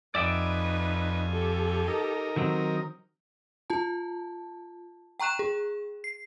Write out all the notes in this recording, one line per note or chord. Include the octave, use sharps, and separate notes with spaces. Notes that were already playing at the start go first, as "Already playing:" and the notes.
F2 D#4 B4 D5 E5 G5 G#5
G4 A4
D#4 A#4
D#3 F#3 C4
F4 A5
G5 A#5 C#6 F#6 E7
G#4
C7